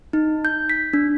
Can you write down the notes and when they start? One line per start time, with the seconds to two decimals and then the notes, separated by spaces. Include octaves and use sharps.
0.13 D#4
0.45 G6
0.69 B6
0.93 D4